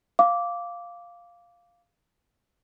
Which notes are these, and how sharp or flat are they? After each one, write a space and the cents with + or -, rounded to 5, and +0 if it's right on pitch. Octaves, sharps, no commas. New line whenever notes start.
F5 +0 D6 -10